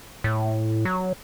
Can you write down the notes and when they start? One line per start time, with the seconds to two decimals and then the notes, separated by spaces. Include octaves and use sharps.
0.24 A2
0.85 F#3